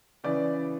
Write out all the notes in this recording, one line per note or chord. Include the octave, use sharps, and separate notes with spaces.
C#3 E3 D5